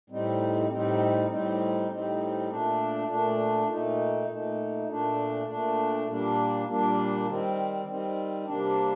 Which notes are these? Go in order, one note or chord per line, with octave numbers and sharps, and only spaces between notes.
A2 G3 C4 D#4
A2 G3 C4 D#4
A2 G3 C4 D#4
A2 G3 C4 D#4
A#2 A3 D4
A#2 A3 D4
A#2 A3 D#4
A#2 A3 D#4
A#2 A3 D4
A#2 A3 D4
A#2 G3 A#3 D4
A#2 G3 A#3 D4
D#3 G3 C4
D#3 G3 C4
C3 G3 A#3 D4